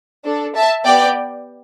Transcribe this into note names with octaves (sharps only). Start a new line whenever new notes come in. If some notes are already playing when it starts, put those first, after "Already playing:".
D4 A4
E5 A5
B3 G4 D5 G5